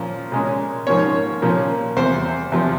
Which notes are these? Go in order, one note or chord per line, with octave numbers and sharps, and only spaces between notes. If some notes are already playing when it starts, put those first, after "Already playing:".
Already playing: A#2 F3 C#4
A#2 G#3 C#4
G#2 F3 A#3 C#4 C#5
A#2 F3 A#3 C#4
E2 C3 G3 C4 C5
E2 C3 F3 C4